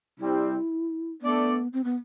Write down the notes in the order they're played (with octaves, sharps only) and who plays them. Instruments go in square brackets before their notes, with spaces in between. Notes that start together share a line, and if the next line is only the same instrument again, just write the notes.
[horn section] C3 G3 C4 [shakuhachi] E4
[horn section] A3 D4 A4 D5 [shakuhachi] B3
[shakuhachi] C4
B3